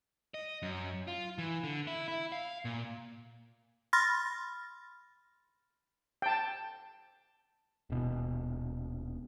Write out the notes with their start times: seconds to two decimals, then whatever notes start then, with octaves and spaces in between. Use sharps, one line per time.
0.34 D#5
0.62 F#2
1.08 F4
1.38 E3
1.64 D3
1.87 E4
2.08 E4
2.32 F5
2.65 A#2
3.93 B5 C6 F6 A6 A#6
6.22 G5 A5
7.90 D#1 B2